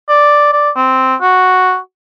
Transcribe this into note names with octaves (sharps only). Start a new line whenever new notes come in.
D5
D5
C4
F#4